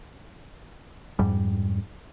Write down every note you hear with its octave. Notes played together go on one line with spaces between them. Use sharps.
F2 G#2 G3